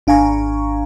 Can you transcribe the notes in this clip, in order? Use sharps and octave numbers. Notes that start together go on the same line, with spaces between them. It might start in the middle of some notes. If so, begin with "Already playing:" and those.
G#1 D4 F5 G#5 A#5 C#6